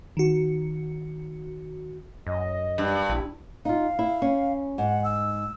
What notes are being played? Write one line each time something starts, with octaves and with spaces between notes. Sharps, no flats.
D#3 F#4
F#2 D#5
G2
A#1 E4
D#4 F4 F5
E4
C#4
G#2 F#5
E6